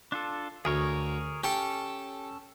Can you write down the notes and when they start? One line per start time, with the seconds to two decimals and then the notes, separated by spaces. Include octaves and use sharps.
0.12 D4 F4 A4
0.65 D2 G#4 A#4 C#5
1.44 C#4 G4 A4 G5 A5